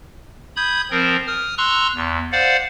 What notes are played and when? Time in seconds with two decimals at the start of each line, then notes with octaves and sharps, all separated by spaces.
0.56 B5 D#6 G6 G#6
0.91 F3 C4 A#4
1.27 D#6 F6
1.58 A#5 C6 C#6 E6 F#6
1.95 E2
2.32 C5 D5 F5 F#5